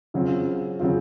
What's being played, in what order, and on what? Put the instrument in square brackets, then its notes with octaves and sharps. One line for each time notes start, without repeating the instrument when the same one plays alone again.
[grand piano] C#3 F#3 C4 F4
C#3 F#3 C4 F4